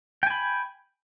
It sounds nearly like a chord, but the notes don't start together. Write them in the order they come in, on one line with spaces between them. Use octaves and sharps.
G5 G#5 B5